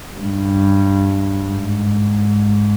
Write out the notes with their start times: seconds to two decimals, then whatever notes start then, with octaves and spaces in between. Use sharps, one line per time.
0.17 G2
1.42 G#2